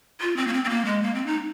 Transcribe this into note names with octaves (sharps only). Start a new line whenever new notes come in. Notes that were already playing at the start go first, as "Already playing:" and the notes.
F4
C4
A#3
C4
C4
A#3
G#3
A#3
C4
D#4